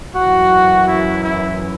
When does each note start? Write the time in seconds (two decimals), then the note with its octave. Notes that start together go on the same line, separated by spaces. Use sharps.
0.13 F#2 E3 F#4
0.84 E4
1.20 E4